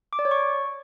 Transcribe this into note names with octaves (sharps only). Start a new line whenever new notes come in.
D6
D5
C#5
C#6